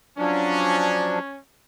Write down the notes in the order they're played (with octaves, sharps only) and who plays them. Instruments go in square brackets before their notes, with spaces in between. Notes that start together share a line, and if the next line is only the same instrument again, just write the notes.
[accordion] F3 F#3 D4 [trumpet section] C#4